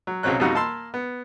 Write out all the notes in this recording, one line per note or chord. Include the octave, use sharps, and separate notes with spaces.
F#3
B1 C#3 F#3 C4 C#4 F#6
F2 B2 G3 D#4 F#4 F#5
A#3 A5 B5 C6 E6
B3